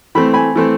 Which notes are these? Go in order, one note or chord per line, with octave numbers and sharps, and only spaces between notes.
E3 A3 C4 B5
G#5 B5
E3 A3 C4